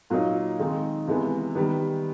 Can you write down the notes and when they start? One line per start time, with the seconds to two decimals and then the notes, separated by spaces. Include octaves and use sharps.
0.10 A#2 F#3 A#3 D#4
0.60 D#3 G#3 C4 D#4
1.08 C3 E3 G#3 B3
1.55 D#3 G3 B3